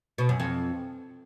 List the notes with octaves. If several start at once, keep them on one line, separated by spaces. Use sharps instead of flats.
B2
F#2
F2